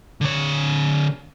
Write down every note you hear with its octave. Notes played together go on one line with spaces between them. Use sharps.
D3 C#5